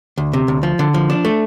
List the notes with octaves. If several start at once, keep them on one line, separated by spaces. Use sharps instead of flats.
D2
C3
D2
F3
D3
F3
D4
A3